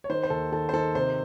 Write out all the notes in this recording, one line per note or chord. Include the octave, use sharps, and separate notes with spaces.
C#5
D#3 C5
C5
D#2 A4
D#3 A4
C5
D#3 A4
C3 C5